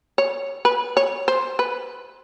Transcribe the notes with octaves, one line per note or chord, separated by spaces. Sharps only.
C#5
B4
C#5
C5
B4